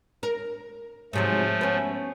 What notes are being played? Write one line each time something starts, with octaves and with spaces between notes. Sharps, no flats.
A#4
G#2 C3 F3 F#3 A3
B3 C#4